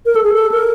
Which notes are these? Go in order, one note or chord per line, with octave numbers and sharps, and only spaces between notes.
A#4
A4
G#4
A4
A#4